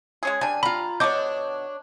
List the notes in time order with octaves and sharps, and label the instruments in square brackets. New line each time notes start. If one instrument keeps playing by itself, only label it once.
[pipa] G#3 C#4 G#4
[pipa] G3 D4 [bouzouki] G#5
[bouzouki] F4 A#5 [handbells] B5
[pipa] B2 D3 D#5 [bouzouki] D4 C#5 [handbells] D6 G6